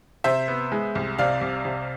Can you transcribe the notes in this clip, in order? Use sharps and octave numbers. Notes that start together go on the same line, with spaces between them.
C3 C5 E5
B3
G#3
C2
C3 D5 F5
C2
C3